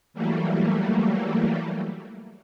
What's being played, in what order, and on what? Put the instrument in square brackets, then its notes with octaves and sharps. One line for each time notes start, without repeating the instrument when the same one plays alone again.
[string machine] E3 F#3 G3 A3 A#3